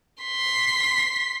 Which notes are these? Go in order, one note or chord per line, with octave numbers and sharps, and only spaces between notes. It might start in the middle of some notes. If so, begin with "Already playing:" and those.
C6 B6